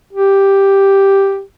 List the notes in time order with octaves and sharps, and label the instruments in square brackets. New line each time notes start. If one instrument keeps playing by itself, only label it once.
[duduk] G4